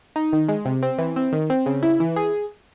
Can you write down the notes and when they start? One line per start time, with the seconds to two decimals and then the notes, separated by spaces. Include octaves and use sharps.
0.16 D#4
0.33 D#3
0.49 G#3
0.65 C3
0.82 C4
0.98 E3
1.16 C4
1.32 D#3
1.50 C4
1.66 C#3
1.83 E4
2.00 E3
2.16 G#4